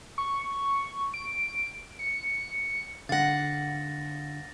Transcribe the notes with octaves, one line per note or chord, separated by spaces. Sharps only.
C#6
D7
C#7
D3 F5 F#5 A6 A#6